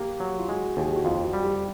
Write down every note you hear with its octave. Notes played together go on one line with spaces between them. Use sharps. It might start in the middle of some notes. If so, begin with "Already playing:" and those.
Already playing: A#3 G4
F#3
F4
G#3 F#4
D#2 G#4
G4
F#4
F2 F4
F#4
G3
G4